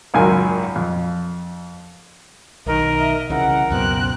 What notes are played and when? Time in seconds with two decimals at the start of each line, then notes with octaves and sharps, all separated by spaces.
0.14 G#1 C#2 F#2 A#4 G#5
0.76 F2
2.66 B1 D#3 A#4 D#5
2.97 D#5 E5
3.30 C2 C#3 E3 A#4 F#5
3.70 C#2 F#2 B2 C4 F#6